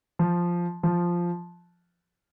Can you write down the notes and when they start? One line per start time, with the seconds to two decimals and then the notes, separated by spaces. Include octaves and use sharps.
0.19 F3
0.83 F3